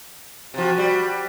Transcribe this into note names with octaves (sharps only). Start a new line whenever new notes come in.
C3 F3 F#4
G3